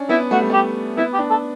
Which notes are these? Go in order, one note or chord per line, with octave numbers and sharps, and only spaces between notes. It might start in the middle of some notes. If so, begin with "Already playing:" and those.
Already playing: C#4 D4
B3 E4
A3 F#4
G3
A3 G4
B3 E4
G4
D4
A4